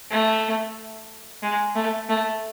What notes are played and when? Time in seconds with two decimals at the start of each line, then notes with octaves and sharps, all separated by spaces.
0.11 A3
1.42 G#3
1.75 A3
2.09 A3